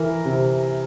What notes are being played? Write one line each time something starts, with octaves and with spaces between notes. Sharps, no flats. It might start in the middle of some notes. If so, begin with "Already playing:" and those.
Already playing: E3 A#4
C3